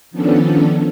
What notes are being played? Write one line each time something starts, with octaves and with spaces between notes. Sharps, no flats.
D#3 F3 B3 C#4 D4 A4